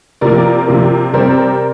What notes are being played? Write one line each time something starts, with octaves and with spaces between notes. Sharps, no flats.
C3 F3 A#3 A#4 D5
C3 F3 A#3
C3 G3 C4 A#4 D5